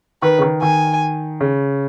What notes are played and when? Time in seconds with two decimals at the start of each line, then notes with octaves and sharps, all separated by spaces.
0.22 D#3 B4
0.38 C#3
0.42 D#3
0.62 D#3 G#5
1.41 C#3